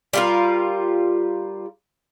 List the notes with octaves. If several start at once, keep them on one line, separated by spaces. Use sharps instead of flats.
G3 F4 A#4